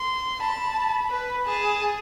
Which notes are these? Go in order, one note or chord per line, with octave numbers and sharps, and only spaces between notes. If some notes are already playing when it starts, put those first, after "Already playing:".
Already playing: C6
A5 B5
B4
G#4 A5